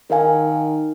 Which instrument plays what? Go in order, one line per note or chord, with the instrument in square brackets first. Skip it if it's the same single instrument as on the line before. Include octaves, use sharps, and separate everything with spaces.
[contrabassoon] D#3 [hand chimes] D#4 A#4 F5 G#5